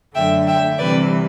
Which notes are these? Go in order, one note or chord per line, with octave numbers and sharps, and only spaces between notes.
F#2 D3 F#3 A3 E5 G5
E5 G5
C3 E3 G3 C4 B4 D5